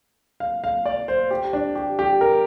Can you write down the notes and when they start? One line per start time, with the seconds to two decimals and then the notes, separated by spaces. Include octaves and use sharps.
0.40 F5
0.64 F5
0.86 D5
1.08 C5
1.31 G4
1.53 D4
1.75 G4
1.99 G4
2.21 A#4